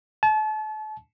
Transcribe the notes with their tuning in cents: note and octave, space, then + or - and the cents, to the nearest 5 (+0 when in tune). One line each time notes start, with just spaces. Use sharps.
A5 -35